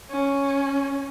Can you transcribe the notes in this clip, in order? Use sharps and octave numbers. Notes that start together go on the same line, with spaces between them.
C#4